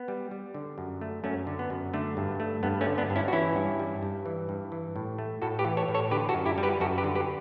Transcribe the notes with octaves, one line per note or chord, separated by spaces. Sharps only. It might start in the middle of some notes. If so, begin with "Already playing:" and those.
Already playing: B3
G3
G3
D3
F#2
A3
F#2 A3 C#4
D3
B3
F#2
D3 A3
G2
A3
G2 B3
A3 C#4
D3
B3 D4
G2
C#4 E4
F#4
E3 C#4 E4
G2
G3
G2
E3
G2
E3
A2
A3
A2 F#4 A4
G4 B4
E3
A4 C#5
A2
A4 C#5
D3 G4 B4
F#4 A4
F#2
E4 G4
G3
G4 B4
F#2 F#4 A4
G4 B4
D3
G4 B4